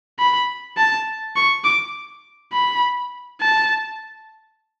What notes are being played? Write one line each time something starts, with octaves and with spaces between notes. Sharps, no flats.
B5
A5
C#6
D6
B5
A5